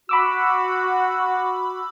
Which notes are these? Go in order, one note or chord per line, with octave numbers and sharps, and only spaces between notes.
F#4 B5 D6 E6